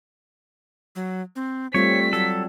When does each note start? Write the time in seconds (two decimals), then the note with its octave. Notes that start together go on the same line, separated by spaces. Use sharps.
0.95 F#3
1.36 C4
1.74 G3 A3 C4 F4 C#5 B6
2.13 F#3 A4